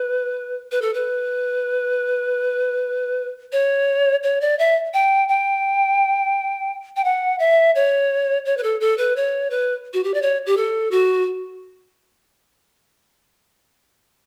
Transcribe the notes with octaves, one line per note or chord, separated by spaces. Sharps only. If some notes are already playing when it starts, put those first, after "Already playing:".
Already playing: B4
B4
A4
B4
C#5
C#5
D5
E5
G5
G5
G5
F#5
E5
C#5
C#5
B4
A4
A4
B4
C#5
B4
F#4
G4
D5
C#5
G4
A4
F#4